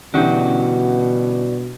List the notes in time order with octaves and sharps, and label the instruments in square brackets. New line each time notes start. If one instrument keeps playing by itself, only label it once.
[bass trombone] B2 [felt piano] D3 E3 G4 [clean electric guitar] G3 F#4 [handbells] C#4 D4